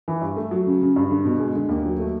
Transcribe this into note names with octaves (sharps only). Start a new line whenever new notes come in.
E3
G2
A3
F#3
C#3
C#3
G2
D3
B2
G#3
D3
D#2
F#3
A3